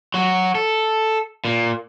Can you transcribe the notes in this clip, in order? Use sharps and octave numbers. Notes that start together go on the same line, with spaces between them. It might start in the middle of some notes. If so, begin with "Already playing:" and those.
F#3 F#4
A4
A#2